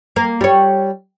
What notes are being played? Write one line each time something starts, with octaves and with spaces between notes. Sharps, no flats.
A#3
G3 C#5